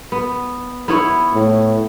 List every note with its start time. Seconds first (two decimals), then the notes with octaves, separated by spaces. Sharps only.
0.12 B3
0.88 B3 E4 C#5
1.33 A2